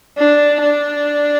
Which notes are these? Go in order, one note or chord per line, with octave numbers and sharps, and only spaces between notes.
D4
D4